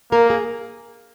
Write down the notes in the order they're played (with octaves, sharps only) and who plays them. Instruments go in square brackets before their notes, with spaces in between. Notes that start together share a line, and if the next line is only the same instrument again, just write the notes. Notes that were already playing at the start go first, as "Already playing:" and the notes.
[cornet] A#3 [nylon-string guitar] A#4
[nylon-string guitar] G#4